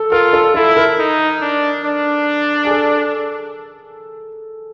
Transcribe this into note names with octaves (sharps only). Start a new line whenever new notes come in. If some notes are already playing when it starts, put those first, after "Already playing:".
Already playing: A4
F4 A#4
A4
E4 A4
A#4
D#4
D4
D4
G#4
A4